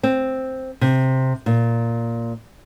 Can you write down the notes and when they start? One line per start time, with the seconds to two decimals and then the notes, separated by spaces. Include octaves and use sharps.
0.03 C4
0.81 C3
1.46 A#2